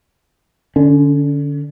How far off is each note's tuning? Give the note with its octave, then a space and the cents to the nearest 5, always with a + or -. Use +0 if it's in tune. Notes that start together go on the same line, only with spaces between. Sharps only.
D3 +0 C#4 +35